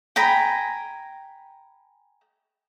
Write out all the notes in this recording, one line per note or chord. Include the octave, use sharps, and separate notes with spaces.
G5 G#5 A#5 B5